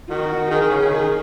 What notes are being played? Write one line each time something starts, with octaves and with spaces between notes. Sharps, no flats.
D#3 F#4
D#3 G#4
D#3
C#3
C#3
D#3